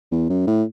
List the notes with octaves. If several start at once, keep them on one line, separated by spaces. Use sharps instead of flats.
E2
F#2
A2